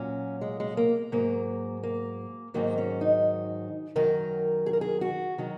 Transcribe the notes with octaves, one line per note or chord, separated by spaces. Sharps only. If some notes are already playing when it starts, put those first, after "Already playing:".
Already playing: A#2 F#3 C#4
G#3
G#3
A#3
G#2 F#3 A#3
A#3
G#2 D#3 F#3 A#3
C#4
D#4
F#2 D#3 F#3 A#4
G#4
A#4
G#4
F#4
D#3 F#3